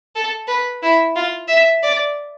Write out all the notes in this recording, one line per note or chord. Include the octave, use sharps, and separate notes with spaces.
A4
B4
E4
F4
E5
D5